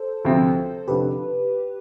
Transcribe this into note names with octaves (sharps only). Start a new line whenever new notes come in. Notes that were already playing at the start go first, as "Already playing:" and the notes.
Already playing: A4 C5
D2 C3 F3 C4
F1 F2 D3 G4 B4